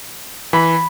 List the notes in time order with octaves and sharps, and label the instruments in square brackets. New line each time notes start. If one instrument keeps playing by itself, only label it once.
[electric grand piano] E3 [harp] B5